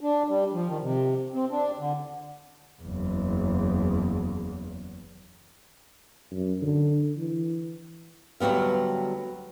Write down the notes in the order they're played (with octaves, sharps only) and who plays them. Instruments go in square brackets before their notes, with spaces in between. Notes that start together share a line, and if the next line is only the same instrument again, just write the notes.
[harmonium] D4
G3
F3
D#3
C3
C4
D4
D3
[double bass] F#1 E2
[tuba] F#2
D3
E3
[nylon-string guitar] D2 F#3 G3 B3 F5